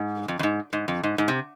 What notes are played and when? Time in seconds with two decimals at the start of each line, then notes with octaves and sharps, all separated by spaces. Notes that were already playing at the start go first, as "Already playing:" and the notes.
Already playing: G#2
0.28 F2
0.39 F2
0.43 G#2
0.73 G#2
0.88 F2
1.03 G#2
1.18 G#2
1.28 C3